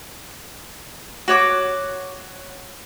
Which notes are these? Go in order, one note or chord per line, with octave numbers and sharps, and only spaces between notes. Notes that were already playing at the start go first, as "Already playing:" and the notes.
F#4 C#5 D6